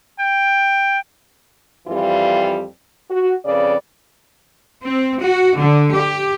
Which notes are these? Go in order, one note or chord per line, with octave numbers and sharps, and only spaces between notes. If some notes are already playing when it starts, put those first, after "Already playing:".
G5
F2 E3 G3 F4
F#4
F2 C#3 B4 D5
C4
F#4
D3
G4